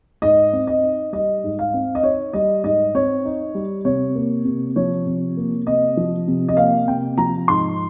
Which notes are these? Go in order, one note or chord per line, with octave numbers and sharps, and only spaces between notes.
G#2 D#5
C4
D#5
D#4
G3 D#5
G#2
F5
C4
D#5
D#4 C#5
G3 D#5
G#2 D#5
C4 C#5
D#4
G3
C3 C#5
A#3
C3
F3 C#5
C3
A#3
C3 D#5
F3
C3
D#5
A#3 F5
C3 G5
F3 A#5
G#2 C6